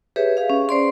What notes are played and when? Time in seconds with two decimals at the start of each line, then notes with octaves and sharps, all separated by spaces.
0.16 G4 G#4 B4 C#5 E5
0.37 G#4 F5
0.50 C#4
0.69 C5 D5 C6